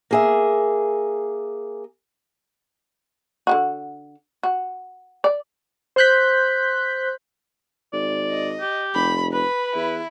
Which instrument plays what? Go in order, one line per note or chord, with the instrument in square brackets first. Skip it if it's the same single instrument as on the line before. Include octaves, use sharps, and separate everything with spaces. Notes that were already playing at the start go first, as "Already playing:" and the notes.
[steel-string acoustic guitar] A#3 G#4 E5
[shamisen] D3 E3 F#4
F#4
D5
[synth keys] C5 C6 F#6 G6 B6
[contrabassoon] G#1 [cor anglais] D5
[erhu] D#5
[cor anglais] G4
[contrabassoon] F1 [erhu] B5
[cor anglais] B4 [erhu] B5
[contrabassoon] E2 [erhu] E4